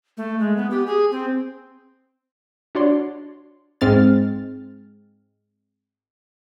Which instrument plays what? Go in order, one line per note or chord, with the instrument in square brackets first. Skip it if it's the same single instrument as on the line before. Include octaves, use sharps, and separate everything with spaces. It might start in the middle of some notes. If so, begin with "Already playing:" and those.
[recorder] A3
G#3
B3
G4
G#4
C4
[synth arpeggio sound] D4 F#4 C#5 D5 C6
G#2 G#3 C4 F6 A6